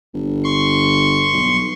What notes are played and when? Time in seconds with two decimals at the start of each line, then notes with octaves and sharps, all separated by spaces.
0.14 G1
0.44 C6 C#6
1.33 B1